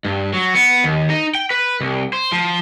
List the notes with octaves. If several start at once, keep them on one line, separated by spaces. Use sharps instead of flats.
G2
F#3
B3
D#2
D#4
G5
B4
C2
C5
F3